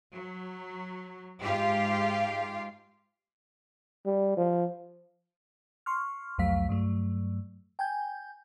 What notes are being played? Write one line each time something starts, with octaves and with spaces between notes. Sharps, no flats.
F#3
G#2 F4 G4 F5
G3
F3
C6 C#6 F6
C2 F2 F#3 A3 F5 B6
G2 F#3 A3
G5 G#5 G6